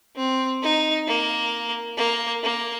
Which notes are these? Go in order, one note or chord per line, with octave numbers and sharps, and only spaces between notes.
C4
D#4
A#3
A#3
A#3